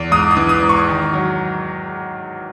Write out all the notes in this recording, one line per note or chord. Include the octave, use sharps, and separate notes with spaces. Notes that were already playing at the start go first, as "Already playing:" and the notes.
Already playing: E2
G#2 D#6
D#6
E3
D#6
G#2
C#6
D#3
F#3